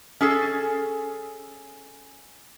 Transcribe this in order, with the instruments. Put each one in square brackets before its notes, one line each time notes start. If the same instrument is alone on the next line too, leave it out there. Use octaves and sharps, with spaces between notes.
[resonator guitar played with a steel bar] C#4 G#4 A4